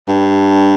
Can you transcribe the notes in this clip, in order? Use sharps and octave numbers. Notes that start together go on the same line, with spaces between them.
G2